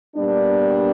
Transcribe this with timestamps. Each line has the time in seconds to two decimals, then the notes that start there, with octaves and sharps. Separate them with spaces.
0.16 A#2 G3 B3 D4